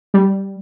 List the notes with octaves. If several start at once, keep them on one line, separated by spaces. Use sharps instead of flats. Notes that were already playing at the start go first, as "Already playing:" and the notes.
G3